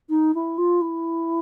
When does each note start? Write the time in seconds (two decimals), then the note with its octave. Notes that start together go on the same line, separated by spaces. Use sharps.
0.09 D#4
0.34 E4
0.58 F4
0.81 E4